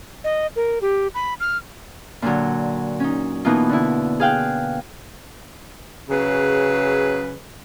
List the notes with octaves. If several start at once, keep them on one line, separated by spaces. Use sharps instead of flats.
D#5
A#4
G4
B5
F6
A#2 D3 F#3
C#4 D#4
B2 E3 A#3 D#4 F4
D3 E4
G#4 F5 G5 F#6
C#3 F#3 G#4 B4